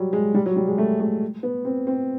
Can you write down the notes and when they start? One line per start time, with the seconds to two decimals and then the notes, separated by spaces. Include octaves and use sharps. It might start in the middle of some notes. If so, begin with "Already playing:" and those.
Already playing: F#3 G3
0.13 G#3
0.34 G3
0.46 F#3
0.57 G3
0.67 G#3
0.78 A3
1.00 A3
1.43 B3
1.65 C4
1.87 C4